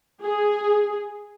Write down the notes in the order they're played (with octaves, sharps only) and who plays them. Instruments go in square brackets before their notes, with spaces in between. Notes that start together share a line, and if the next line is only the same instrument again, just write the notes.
[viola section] G#4